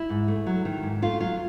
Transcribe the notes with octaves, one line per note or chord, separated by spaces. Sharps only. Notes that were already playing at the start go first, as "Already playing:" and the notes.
Already playing: E4
G#2
A3
F#3
D#3
G#2
A3 F4
F#3 F4